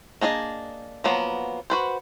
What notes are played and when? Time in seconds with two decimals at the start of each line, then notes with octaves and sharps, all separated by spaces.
0.21 A#3 D4 G#4 D#5
1.04 F3 F#3 A#3 B3
1.70 F#4 B4 C5